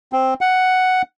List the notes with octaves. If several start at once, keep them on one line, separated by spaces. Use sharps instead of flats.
C4
F#5